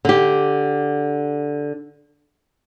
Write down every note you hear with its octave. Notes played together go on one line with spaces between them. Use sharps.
D3 G4